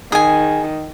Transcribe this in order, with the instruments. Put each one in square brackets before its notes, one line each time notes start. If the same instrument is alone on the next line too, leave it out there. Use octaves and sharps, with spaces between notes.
[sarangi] D#3 [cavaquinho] G#4 G#5